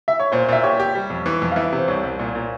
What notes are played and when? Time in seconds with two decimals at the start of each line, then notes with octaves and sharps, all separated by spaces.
0.08 E5
0.20 C#5
0.32 A#2 C5
0.48 A#2 E5
0.63 G4 C#5
0.80 G4
0.95 G3
1.10 F2
1.26 E3
1.42 F2
1.52 F5
1.56 E3 E5
1.72 C3
1.78 C5
1.88 C2 C#5
2.03 C2
2.19 A#2
2.35 A#2